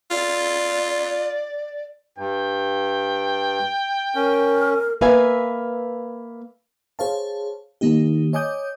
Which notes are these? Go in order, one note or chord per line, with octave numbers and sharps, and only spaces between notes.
F4 D5
G2 G5
C#4 A#4
A#3 B4 E5 F5 G#5
G#4 C5 C#5 F5 A5
D#3 A#3 D#4 G4
C#5 D#5 G#5 D6 D#6 G6